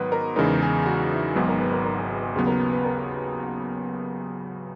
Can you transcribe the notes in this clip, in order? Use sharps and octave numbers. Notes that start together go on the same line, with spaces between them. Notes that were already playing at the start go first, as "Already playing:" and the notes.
Already playing: G#2 D#3 F#3 B3 B4
A#4
E2 C#3 E3 G#3 D#4 A#4
G#4
F#4
E4
G#1 G#2 F#3 B3 G#4
A#4
B4
A#4
A#4
G#4
G#4
G#4
D#2 C#3 F#3 B3 B4
A#4
B4
A#4